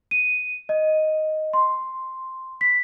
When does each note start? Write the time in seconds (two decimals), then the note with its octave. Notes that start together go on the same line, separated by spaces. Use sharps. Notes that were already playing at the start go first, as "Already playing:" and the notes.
0.11 D#7
0.69 D#5
1.53 C6
2.61 B6